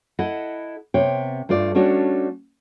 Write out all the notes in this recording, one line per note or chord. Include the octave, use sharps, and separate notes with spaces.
E4 A4 D#5 F#5
C3 B3 C#5 G5
G2 A3 F4 D5
G3 A3 C#4 D4 F#4 C#5